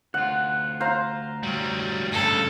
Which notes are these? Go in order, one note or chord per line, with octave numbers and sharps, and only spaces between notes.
D2 F4 F#5
C5 F5 A#5
F#3 G3
G2 C#3 A4